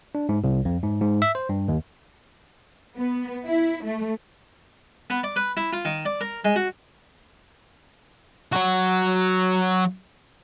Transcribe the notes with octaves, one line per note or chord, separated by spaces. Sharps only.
D4
G#2
C2
F2
G#2
G#2
E5
C5
G2
D#2
B3
E4
A3
B3
D5
B4
E4
F4
D#3
D5
A#4
G#3
F#4
F#3 F#4